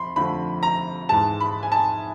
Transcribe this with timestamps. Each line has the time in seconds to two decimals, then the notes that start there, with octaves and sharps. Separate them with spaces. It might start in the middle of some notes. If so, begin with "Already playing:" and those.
Already playing: F2 B5 C6
0.16 F2 D3 F3 A3 B5
0.63 A#5
1.09 G#2 E3 G#3 A5
1.41 B5
1.63 G#5
1.72 A5